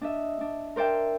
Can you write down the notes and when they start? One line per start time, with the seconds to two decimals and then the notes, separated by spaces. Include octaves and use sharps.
0.01 D4 D#5 E5
0.41 D4
0.76 A#4 C5 D5 E5 G5